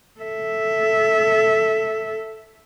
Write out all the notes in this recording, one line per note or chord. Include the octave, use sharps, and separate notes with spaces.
A4 E5